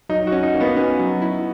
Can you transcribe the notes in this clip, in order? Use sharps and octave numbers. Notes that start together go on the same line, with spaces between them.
F#3 D#4
F#4
C#4
D#4
A#3
B3
C#4
F#3
E4